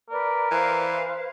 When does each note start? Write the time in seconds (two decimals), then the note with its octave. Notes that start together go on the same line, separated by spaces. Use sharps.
0.09 A#4 B4 D5
0.51 E3 B4 C5 F5